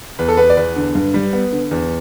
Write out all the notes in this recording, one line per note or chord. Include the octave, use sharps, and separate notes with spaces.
E2 B4
A4
B3 B4
D5
E2 B4
D3
G2
G3
B3
D3
E2